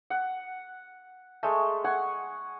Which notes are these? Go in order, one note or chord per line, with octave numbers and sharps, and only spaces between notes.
F#5
G#3 A3
F#5 G#5 C#6